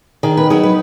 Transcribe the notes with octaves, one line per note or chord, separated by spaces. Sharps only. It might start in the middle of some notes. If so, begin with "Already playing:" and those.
D#3 G#4
B4
F#3 D#4 G#4
B4